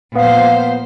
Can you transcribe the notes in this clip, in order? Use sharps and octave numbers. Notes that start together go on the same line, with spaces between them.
A#2 F3 B3 C5 F5